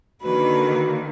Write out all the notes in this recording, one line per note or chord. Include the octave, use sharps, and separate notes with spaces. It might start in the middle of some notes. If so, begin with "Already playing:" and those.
D3 D#3 A#3 F#4 B4